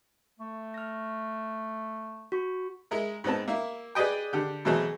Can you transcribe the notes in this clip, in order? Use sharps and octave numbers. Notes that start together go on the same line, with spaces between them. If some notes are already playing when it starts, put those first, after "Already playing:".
A3
F6 A#6
F#4 C#6
G#3 E4 A#4
G#2 B3 C4 A5
A#3 E4
G#4 B4 D5 D#5 G5
D3 G4
B2 E3 F#3 A3 C4 G#4